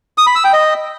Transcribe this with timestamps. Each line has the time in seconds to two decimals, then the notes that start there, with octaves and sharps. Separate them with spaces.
0.18 D#6
0.27 B5
0.35 E6
0.44 G5
0.53 D#5